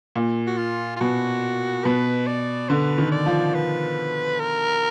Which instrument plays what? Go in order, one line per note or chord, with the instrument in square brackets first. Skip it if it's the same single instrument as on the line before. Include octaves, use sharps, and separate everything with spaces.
[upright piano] A#2
[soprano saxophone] F#4
F4
F4
[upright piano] B2 [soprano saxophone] F#4
[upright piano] B2 [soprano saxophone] B4
[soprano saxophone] D5
[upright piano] D3 [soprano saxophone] B4
[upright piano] D#3
[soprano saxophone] D5
[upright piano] F3
[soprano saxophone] B4
A#4